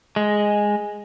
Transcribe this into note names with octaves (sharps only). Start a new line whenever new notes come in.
G#3